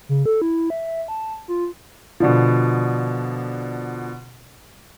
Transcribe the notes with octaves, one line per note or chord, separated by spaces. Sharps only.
C#3
A4
E4
E5
E5
A5
F4
B2 D3 F3